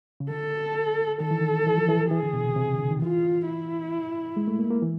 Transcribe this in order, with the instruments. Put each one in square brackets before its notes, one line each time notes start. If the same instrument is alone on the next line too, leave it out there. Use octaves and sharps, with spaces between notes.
[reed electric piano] C#3
[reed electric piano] D3 [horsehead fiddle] A4
[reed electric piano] D#3 [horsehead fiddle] A4
[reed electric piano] E3
D#3
E3
F3
E3
[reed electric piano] E3 [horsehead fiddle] G#4
[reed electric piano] D3
B2
C3
C3
C#3
D3
D#3
[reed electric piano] E3 [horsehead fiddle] F4
[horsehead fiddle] E4
[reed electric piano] G#3
A3
A#3
A#3
E3